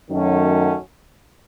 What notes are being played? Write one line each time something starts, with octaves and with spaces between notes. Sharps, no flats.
F#2 D#3 F#3 A3 C#4